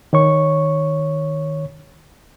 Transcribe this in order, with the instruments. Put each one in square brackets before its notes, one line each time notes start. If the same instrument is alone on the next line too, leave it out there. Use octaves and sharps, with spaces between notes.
[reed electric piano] D#3 C#5 C#6